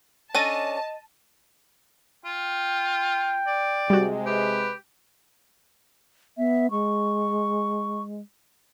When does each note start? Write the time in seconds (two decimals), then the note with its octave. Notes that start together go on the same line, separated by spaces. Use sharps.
0.35 C#4 D4 A4 D#5 A5 A6 A#6 D#7
2.25 F4 G5
3.47 D5
3.90 C3 G3 G#3 F#4
4.26 G4 B4
6.38 B3 E5
6.71 G#3 C#6